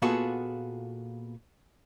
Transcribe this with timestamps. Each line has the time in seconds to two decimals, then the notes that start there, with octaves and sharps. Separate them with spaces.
0.02 A#2 B3 F4 F#4 G#4 A4